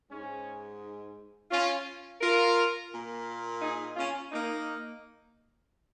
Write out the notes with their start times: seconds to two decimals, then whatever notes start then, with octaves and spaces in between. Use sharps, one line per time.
0.10 G#2 G#3 C#4
1.51 C#4 F4
2.21 F4 A#4
2.92 A#2 A#3
3.61 D#4 G#4
3.96 C#4 F4
4.32 A#3 D#4